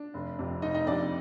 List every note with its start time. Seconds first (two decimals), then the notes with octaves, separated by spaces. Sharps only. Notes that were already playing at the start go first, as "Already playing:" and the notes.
Already playing: D4
0.14 F1
0.39 F2 C3
0.62 F1 D#4 D#5
0.74 D#4 D#5
0.87 F2 C3 D4 D5